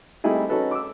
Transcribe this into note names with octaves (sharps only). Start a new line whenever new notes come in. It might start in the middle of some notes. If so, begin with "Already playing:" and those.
G3 A3 C4 D#4 E4 G#4
C#4 D#4 F#4 A4 B4
D6 E6